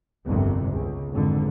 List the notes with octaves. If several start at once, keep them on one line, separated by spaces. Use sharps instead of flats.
G1 C2 F2 C3
C#2
G#1 F2 D3